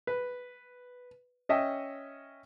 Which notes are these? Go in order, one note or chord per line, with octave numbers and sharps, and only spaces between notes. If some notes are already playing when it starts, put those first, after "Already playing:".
B4
C#4 D#5 E5 G5